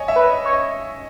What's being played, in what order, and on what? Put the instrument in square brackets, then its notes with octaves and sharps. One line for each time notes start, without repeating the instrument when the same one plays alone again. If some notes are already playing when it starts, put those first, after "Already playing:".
Already playing: [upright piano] C#5 D#5 G#5
E5
[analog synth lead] B4
[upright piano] D#5
[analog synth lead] C#5
[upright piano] D#5